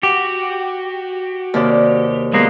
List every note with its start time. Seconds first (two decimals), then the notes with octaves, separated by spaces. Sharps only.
0.03 F#4 G4 F#5
1.54 D#2 C3 D5
2.34 F#3 G#3 A#3 B3 F4